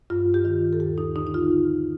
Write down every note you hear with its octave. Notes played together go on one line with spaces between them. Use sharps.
G2 F4
G4
D#3 F4
A4
D#2 G4
D#4
D3 D#4
D#4
F4